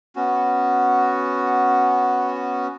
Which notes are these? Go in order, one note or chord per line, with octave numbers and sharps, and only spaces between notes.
B3 C#4 F#4